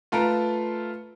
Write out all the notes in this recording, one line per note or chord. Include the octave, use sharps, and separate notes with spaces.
A3 F4 A4 B4 A#5 D7